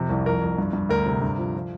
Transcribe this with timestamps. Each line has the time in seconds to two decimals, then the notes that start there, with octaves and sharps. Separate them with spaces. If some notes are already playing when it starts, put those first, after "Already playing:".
Already playing: F2 C3
0.10 C2
0.26 F2 A#4
0.41 F2
0.58 G2
0.73 G2
0.89 D2 A#4
1.06 C3
1.22 G2
1.38 F3
1.55 F3